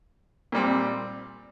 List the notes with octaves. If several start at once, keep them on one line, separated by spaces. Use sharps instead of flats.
A#2 G3 C4